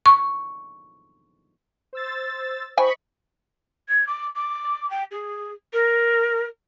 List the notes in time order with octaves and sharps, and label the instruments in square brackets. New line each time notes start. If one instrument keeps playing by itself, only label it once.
[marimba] C#6
[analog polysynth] C5 E6 A6
[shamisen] E3 G5 G#5 [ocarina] C5 [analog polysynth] D#5 B5 C#6
[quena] G#6
D6
D6
G5
G#4
A#4